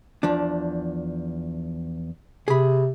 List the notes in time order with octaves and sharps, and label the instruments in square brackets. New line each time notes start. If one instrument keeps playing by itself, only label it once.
[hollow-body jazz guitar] E2 F3 D4
[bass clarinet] C3 [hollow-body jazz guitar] G#4 B5